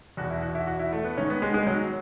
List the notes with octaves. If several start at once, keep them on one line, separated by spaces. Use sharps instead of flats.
E2 B2 F#4
E4
F#4
E4
F#4
E4
A3
B3
G#2 D#3 C#4
B3
G#3
G#3
F#3